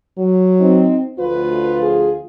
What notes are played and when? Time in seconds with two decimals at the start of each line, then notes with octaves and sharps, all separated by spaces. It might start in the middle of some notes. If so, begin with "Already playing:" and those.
0.18 F#3
0.60 C4 D#4
1.19 D2 F3 F4 B4
1.82 G#4